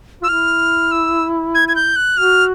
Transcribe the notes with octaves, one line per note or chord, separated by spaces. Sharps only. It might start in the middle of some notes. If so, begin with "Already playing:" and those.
F4 E6
E4 F6
E6
G#6
G#6
G6
F#6
F#4 F6